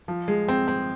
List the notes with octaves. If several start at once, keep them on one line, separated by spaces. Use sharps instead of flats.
F3
G#3
C4
C4